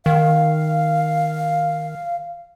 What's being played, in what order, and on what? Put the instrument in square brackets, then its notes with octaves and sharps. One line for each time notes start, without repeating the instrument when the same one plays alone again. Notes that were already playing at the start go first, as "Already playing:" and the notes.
[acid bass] D#3 [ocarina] F5